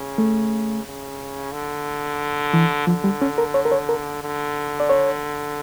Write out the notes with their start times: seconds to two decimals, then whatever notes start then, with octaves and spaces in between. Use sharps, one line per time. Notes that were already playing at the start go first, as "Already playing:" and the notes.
Already playing: C#3
0.18 A3
0.86 C#3
1.53 D3
2.53 E3
2.87 D3 F3
3.04 G3
3.21 C#4
3.38 A#4
3.54 C#5
3.65 A#4
3.72 C#5
3.89 A#4
4.22 D3
4.80 D5
4.89 C#5